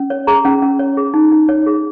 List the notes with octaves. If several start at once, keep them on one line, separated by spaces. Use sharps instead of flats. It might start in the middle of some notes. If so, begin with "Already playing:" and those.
Already playing: C#4
C#5
G#4 A#5
C#4
C#4
C#5
G#4
D#4
D#4
C#5
G#4